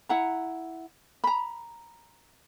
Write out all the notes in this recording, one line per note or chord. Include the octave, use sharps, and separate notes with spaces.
E4 F#5 A#5
A#5 B5